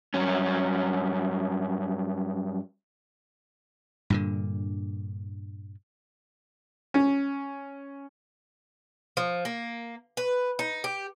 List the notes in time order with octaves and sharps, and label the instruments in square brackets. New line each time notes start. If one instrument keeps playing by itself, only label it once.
[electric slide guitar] G2 F#3 C#4
[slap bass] G2 A#2 D3
[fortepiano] C#4
[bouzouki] F3
A#3
B4
D#4
G4